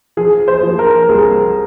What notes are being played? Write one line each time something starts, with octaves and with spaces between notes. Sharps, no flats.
F3 G#4
C5
F3
A#4
C2 G#4